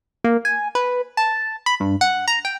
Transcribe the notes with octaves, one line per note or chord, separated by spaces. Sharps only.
A#3
G#5
B4
A5
B5
G2
F#5
A#5
G5